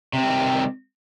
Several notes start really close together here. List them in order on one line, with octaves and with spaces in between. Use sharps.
C3 C4 G3 D#3